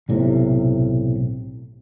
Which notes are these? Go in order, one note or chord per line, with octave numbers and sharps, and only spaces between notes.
B1 A2 C3